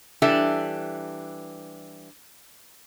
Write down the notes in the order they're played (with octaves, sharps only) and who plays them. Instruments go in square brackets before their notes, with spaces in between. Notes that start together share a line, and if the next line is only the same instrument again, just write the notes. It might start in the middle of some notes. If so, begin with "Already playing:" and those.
[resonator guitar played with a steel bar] E3 G3 D4 A4 E5